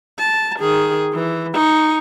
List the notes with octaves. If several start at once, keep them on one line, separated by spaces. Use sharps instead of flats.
A5
D#3 G#4
E3
D#4 C#6